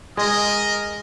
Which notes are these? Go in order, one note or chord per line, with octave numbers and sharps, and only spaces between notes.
G#3 A#4 D#5